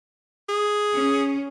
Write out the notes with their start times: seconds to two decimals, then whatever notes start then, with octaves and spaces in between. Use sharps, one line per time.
0.49 G#4
0.94 C#4